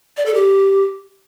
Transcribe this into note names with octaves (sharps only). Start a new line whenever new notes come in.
D5
A4
G4